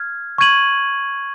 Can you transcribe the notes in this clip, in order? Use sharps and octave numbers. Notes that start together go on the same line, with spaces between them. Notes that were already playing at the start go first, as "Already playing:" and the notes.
Already playing: F6 G#6
C#6 G#6 D#7 F#7